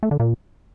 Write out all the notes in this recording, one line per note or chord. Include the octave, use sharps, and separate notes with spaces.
A3
D3
A#2